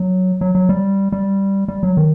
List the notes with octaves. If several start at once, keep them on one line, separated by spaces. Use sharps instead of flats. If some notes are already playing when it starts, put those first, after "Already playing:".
Already playing: F#3
F#3
F#3
G3
G3
G3
F#3
D#3